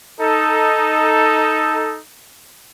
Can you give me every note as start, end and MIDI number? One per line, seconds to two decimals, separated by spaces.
0.21 1.99 63
0.21 1.99 69